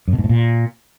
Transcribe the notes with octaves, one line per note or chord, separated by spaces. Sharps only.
F#2
B2
G#2
A2
A#2